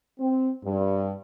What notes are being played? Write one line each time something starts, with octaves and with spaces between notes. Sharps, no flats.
C4
G2